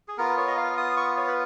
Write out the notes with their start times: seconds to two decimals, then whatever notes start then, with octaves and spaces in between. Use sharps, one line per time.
0.08 G#4
0.18 B3 F4 A#4
0.37 C#5
0.48 D#5
0.57 F5
0.77 D#6
0.97 C#6
1.17 C#5
1.27 B4